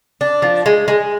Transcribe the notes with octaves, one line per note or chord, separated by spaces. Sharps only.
D4
F3
G#3
G#3